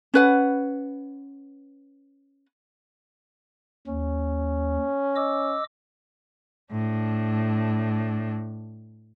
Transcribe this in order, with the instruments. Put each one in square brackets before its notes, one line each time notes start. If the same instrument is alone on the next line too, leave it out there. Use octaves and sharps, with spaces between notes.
[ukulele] C#4 B4 F#5
[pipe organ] D#2 [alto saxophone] C#4
[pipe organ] D#5 D6 E6
[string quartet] A2 D4